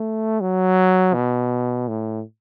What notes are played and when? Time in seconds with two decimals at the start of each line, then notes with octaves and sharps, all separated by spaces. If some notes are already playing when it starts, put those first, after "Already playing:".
Already playing: A3
0.40 F#3
1.14 B2
1.88 A2